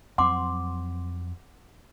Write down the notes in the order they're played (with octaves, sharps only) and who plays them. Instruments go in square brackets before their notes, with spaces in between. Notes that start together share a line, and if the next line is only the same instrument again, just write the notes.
[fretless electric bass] F2 F#3 C4 [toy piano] F#5 C6 D6